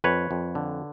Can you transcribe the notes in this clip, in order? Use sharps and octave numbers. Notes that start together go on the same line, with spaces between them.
F2 B4 C#5
F2
D3